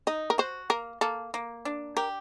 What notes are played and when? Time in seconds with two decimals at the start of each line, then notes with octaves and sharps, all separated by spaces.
0.07 D#4 D#5
0.30 A#4
0.38 F#4 C5
0.70 A#3 A#4
1.01 A#3 A4
1.34 A#3
1.65 D4
1.97 G4 A#4